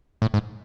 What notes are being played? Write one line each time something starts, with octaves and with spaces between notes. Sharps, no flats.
A2
G#2